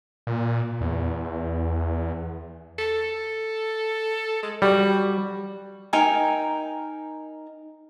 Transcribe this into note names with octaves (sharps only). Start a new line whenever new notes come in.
A#2
E2
A4
G#3
G3 F#4
D#4 A#4 G5 G#5